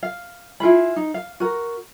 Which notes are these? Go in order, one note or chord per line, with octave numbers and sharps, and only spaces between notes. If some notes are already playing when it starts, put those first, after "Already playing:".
F5
E4 F4 G#4 B5
D#4
F5
F#4 A#4